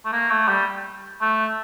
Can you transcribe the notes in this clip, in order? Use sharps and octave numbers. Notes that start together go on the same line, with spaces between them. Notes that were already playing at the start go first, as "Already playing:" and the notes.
A3
A#3
A3
G3
A3